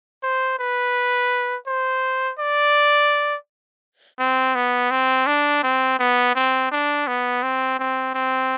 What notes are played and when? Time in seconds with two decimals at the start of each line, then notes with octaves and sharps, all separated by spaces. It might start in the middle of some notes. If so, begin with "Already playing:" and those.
0.23 C5
0.59 B4
1.67 C5
2.39 D5
4.19 C4
4.55 B3
4.91 C4
5.27 D4
5.63 C4
6.00 B3
6.36 C4
6.72 D4
7.07 B3
7.43 C4
7.79 C4
8.15 C4